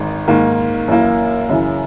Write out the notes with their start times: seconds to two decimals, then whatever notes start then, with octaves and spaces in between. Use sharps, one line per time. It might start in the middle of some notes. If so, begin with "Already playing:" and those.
Already playing: G#1 G#2 D#3
0.27 G#2 D#3 A#3
0.88 F#2 E3 A#3
1.49 F#2 C#3 E3